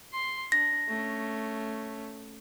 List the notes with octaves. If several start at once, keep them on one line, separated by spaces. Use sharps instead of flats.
C6
D4 A#6
A3 C#4